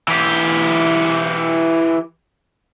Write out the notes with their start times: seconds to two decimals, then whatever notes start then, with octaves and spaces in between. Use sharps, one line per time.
0.08 E3 G4